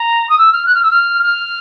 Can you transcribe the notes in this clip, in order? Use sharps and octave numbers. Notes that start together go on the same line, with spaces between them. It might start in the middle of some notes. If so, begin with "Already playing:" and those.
Already playing: A#5
D#6
E6
F6
F#6
F6
E6
F6
F6